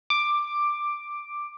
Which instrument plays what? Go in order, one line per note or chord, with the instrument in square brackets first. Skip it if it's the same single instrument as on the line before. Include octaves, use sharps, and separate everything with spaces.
[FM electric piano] D6